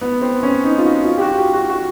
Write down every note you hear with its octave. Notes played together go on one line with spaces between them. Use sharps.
B3
C4
C#4
D#4
F4
F#4
F4
G4
F#4
G4
F#4
F#4